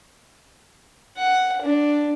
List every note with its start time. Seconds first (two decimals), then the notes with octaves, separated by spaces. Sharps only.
1.17 F#5
1.62 D4